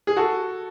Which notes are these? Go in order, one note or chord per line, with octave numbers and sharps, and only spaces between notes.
G#4
F#4 A4